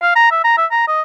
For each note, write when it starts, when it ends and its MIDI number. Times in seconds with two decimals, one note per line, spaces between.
0.02 0.15 77
0.16 0.31 82
0.31 0.43 76
0.44 0.55 82
0.57 0.66 76
0.71 0.85 82
0.87 1.02 75